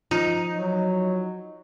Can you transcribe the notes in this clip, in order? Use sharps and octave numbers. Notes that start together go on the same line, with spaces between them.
F3 D#4
F#3